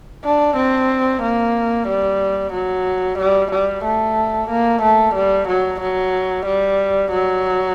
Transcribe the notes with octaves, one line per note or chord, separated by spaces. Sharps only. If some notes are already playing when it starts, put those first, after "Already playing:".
D4
C4
A#3
G3
F#3
G3
G3
A3
A#3
A3
G3
F#3
F#3
G3
F#3